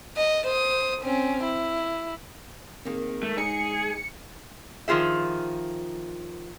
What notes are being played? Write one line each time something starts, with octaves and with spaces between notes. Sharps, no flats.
D#5
C5 D#6
C4 C#4
E4
D#3 A#3 C4 G#4
G#3 A3
D#4 G#4 C#7
D#3 F3 F4 G#4 E5